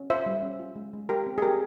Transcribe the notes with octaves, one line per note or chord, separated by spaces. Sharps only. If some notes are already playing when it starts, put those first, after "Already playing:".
Already playing: C#4
F4 C5 E5
G3
C#4
F4
G#3
G#3
G4 A#4
C4
G#4
G4 A#4